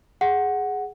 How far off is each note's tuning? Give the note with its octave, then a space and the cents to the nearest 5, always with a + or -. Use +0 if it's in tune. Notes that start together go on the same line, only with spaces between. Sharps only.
G#4 +0 F#5 +0